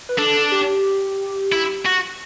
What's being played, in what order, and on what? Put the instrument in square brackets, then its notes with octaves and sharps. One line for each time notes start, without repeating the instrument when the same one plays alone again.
[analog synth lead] B4
[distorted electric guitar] D4 [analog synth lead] A4
[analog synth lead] G4
[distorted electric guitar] E4
F#4